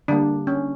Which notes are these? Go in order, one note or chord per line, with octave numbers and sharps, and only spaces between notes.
D3 G3 A#3 D4
C#4